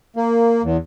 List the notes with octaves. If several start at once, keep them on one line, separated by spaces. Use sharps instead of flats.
A#3
E2